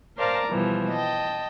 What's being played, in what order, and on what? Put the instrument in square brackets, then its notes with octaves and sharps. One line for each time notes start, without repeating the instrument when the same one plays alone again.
[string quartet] A#4 C5 D5 F5 A5 A#5
B2 E3 F3 G3
D#5 G5 A5